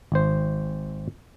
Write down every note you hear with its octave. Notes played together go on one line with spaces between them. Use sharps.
G#1 C5